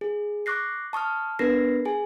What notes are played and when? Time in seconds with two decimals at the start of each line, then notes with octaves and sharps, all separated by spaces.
0.01 G#4
0.46 C#6 D6 F#6 A#6 C7
0.93 A5 C#6 D#6 F6
1.39 B3 D4 A#4 B4 A#6 C7
1.85 G#4 G#5